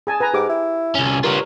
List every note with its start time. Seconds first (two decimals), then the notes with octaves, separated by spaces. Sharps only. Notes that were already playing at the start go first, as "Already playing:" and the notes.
0.07 G#4 G#5 A5
0.20 B4 G#5 A#5
0.34 G#2 G4 D6
0.49 E4
0.95 C2 C#4
1.24 G2 F4 A#4 C#5